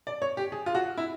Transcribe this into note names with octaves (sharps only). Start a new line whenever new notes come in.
D5
C#5
G4
G#4
F4
F#4
E4